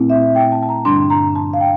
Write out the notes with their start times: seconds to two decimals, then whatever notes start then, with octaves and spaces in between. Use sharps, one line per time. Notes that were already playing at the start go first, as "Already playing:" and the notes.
Already playing: A#2 A3 C4 E4
0.10 E5
0.35 G5
0.52 A5
0.63 A5
0.69 A#5
0.85 G2 D3 G3 D4 C6
1.10 A#5
1.35 A5
1.54 F5
1.61 G5